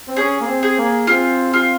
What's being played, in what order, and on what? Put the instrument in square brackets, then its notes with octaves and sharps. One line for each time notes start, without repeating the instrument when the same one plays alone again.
[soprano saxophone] C4
[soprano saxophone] C#4 [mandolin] G#4
[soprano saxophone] A#3
C4
[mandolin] G#4
[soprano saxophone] A#3
[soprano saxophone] C4 [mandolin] F4
[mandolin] F4